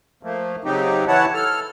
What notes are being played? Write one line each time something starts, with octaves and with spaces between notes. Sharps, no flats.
F3 A3 A#3
C#3 F#3 C4 D#4 G4
E3 E4 C#5 F#5 A5
A4 F6